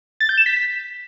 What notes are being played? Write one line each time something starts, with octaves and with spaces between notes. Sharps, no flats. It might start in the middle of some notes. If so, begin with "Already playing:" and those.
A6
G6
E7
B6